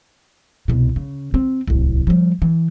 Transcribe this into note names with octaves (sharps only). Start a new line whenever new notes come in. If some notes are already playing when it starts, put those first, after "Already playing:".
C2 B2
C#3
C4
D1 C2
F3 G3
E3